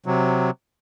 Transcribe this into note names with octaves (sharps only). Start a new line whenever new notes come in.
C3 F#3